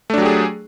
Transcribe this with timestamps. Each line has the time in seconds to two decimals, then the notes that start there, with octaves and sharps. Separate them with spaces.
0.10 A3
0.14 D4
0.18 F#3
0.22 G4
0.26 G#4